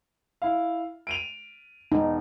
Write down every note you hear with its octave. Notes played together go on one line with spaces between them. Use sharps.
E4 F5
D7 D#7 F7
E1 D#4